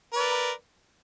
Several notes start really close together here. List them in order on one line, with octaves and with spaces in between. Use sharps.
B4 D5 A#4